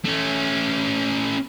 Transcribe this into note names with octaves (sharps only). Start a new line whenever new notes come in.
A3 C#4